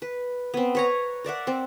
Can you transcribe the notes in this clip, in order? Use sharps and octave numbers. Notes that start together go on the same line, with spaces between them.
B4
B3 C4
B4 C#5 A#5
A#4 D5 E5 F#5
C4